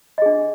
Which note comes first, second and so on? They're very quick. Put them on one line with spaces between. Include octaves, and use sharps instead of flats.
D#5 G#4 D4